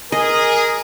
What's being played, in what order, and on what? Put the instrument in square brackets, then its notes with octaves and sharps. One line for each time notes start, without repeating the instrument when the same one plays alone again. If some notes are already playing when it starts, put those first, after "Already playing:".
[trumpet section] G#4 [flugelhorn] A#4 [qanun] D#5